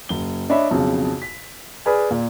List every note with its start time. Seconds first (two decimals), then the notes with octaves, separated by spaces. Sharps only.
0.09 F#1 G7
0.49 D4 C#5 D#5 E5 B5
0.71 B1 F2 C#3
1.22 B6
1.86 G#4 B4 D5 G#5 F6
2.11 A#2